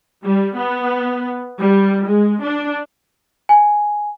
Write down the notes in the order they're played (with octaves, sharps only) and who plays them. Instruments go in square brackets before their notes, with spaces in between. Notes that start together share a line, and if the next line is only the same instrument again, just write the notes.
[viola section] G3
B3
G3
G#3
D4
[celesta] G#5